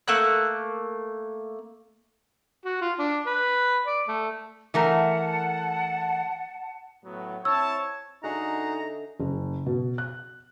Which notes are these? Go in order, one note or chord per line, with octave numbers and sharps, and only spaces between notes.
A3 A#3 F#6
F#4
F4
D4
B4
D5
A3
E3 A3 A#4 F#5 A5
A2 F#3 B3
C4 E4 C#5 A5 E6
D3 D#4 F#4 G#4 D#5 E5 F#5 A#5
F#1
B2
F#6